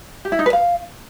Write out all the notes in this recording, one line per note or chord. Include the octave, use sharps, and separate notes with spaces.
G4
E4
D#4
B4
F5